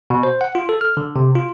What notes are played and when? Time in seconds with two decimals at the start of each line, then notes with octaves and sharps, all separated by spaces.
0.10 B2
0.23 C5
0.41 F#5
0.55 F4
0.69 A4
0.81 F6
0.97 D3
1.16 C3
1.35 F4